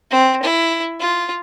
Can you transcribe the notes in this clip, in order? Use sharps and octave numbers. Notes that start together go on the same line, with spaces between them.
C4
E4
F4